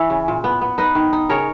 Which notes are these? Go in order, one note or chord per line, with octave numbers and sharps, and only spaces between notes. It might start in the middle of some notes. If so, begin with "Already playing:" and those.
Already playing: E3 C#5 E5
C#3
A#2
B3
B3
D#4 B4 D#5
D#3
D#4
C#3 A#4 C#5